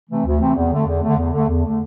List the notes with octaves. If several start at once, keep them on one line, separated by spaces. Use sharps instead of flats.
C3 E3 A3 C4
D2
C3 E3 A3 C4
E2
D3 A3
E2
D3 A3
E2
D3 A3
E2
D3 A3